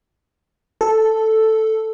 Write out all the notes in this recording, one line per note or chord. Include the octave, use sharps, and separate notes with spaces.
A4